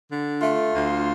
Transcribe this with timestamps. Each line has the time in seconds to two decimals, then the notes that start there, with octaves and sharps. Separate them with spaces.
0.11 D3
0.42 A3 F4
0.74 D2